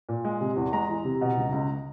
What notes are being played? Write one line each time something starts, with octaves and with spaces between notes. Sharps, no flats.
A#2
G#3
C3
E2
G#3 A#5
E3
C3
B2
C#2
C#2